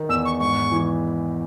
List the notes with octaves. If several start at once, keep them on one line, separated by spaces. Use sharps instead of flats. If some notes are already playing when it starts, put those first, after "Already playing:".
Already playing: D#3
E2 E6
C#6
G#2 C#6
E3